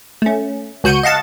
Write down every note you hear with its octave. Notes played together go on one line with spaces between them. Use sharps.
A3 C#4
C#2 F#4 G6 C#7 D#7
D#5 F5 F#5 A5 A6